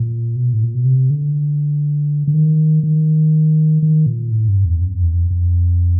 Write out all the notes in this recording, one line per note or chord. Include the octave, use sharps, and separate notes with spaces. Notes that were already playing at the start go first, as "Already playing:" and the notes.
Already playing: A#2
B2
A2
A#2
B2
C3
D3
D3
D#3
D#3
D#3
A#2
A2
G2
E2
F#2
F2
E2
F2
F2